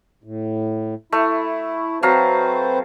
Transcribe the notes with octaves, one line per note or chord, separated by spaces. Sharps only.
A2
A3 E4
F#3 C4 B4 C5 F5 A5